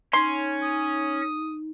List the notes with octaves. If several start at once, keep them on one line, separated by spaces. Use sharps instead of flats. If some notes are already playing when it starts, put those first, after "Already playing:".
C#4 D#4 C6
D#6